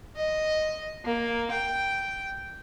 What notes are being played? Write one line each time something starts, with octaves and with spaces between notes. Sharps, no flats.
D#5
A#3
G5